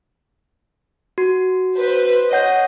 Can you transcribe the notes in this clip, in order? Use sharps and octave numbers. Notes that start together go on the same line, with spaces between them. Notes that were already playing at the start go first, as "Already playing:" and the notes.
F#4
B4 C5
C#5 D#5 F#5 G6